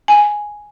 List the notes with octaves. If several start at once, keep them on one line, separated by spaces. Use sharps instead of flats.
G#5